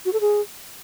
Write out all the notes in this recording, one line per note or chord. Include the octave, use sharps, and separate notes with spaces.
F#4
A4
G#4